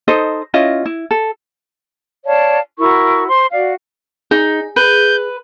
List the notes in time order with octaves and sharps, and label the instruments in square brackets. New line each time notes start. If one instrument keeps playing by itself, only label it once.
[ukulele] D#4 A4 C5 D#5
C#4 E4 F4 D#5
E4
A4
[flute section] C#5 D5 F5 A5
E4 F#4 A#4 C#6
C5 C6
F#4 D5 F5
[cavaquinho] D#4 [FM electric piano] G#4
[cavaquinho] B4 [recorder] G6